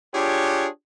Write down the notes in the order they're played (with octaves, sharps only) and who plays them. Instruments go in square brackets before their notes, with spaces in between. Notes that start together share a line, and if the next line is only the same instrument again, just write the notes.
[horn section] D4 F4 G4 G#4 C#5